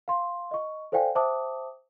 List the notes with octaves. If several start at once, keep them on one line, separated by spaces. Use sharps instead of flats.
F5 C6
D#5 C#6
A4 C5 D5 F5 G5 G#5
C5 E5 G5 A5 D6 D#6